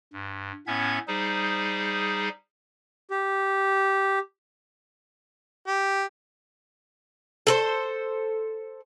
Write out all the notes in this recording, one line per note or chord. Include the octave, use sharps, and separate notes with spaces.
G2
A2 B3 C#4 E5 G#6
G3 D#4 G#4 C5
G4
G4
A4 A#4 C5